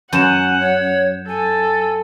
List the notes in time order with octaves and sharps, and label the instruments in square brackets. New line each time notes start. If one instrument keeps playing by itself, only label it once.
[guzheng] F#2 [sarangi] F#5 [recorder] G#5 [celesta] G6 E7
[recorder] C#5
[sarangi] A4 [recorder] G#5